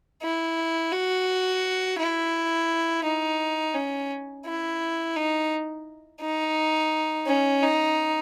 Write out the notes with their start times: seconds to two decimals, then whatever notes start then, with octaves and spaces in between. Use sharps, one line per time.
0.22 E4
0.92 F#4
1.98 E4
3.05 D#4
3.74 C#4
4.45 E4
5.16 D#4
6.21 D#4
7.27 C#4
7.63 D#4